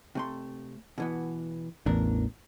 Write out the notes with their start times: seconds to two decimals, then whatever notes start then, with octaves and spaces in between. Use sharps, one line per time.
0.15 C3 A3 C6
0.98 B2 E3 B3
1.86 A1 E2 D4 A#4